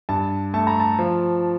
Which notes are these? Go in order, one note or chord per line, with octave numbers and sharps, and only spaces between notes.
G2 A5
A3 A5
A#5
A5
F3